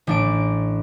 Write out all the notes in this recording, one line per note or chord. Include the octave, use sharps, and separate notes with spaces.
A1 D4 D7